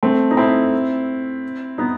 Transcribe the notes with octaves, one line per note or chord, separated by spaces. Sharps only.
A3 C4
D#4
C4 E4
B3 D#4